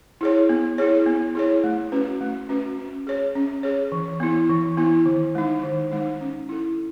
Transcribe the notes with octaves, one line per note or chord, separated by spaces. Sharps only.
E4 G#4 C#5
B3
E4 G#4 C#5
B3
E4 G#4 C#5
A3
C#4 F#4 B4
A3
C#4 F#4 B4
C#4
G#4 C#5
C#4
G#4 C#5
E3
B3 E4
E3
B3 E4
D#3
G#3 D#4
D#3
G#3 D#4
C#4
E4 A4